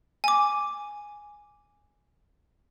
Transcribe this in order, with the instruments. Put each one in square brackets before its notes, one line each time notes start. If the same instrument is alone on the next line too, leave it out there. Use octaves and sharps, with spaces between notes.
[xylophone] G#5 D6